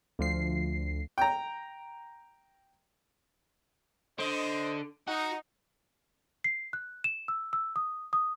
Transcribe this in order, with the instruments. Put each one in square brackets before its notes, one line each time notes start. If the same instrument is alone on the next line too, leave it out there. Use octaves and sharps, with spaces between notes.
[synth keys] D2 F3 C7
[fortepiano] G5 A#5
[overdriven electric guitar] D3 [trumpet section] C5 D#5
[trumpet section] D#4 [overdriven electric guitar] F#4
[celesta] C7
F#6
E7
E6
E6
D#6
D#6